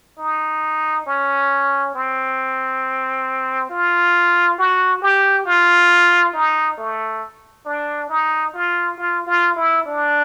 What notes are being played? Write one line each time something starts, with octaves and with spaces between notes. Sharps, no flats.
D#4
C#4
C4
F4
F#4
G4
F4
D#4
A3
D4
D#4
F4
F4
F4
E4
D4